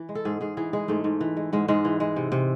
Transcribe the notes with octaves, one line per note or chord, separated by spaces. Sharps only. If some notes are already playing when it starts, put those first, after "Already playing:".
Already playing: E3
G#3
A4
G#2 G#4
G#2 G#4
E3 G#4
G#3 G#4
G#2 A3
G#2
E3
G#3
G#2 G#3
G#2 G#3
E3
G#3
C3
C3